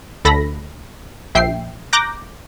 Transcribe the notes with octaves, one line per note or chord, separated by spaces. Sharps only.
D2 A4 B5 A#6
A#1 E5 G5 C7
A#5 D6 F#6 G6 A#6